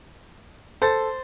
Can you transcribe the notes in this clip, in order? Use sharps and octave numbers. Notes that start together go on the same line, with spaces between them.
A4 C5 A6